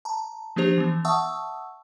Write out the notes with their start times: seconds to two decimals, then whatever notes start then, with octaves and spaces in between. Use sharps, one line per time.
0.05 A5 A#5
0.56 F3 A#3 D4 G4 C5 F7
0.78 E3 B3
1.05 E5 F#5 A5 C#6 D#6 E6